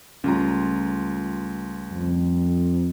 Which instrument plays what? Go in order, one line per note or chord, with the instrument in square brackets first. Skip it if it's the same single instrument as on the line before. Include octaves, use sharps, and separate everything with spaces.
[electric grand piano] C#2 F4 A#5 [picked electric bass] G3 A3 C#4
[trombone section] F2